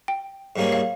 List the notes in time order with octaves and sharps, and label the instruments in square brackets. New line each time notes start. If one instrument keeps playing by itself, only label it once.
[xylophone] G5
[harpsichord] G#2 G3 A#3 C#4 G#4
[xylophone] F5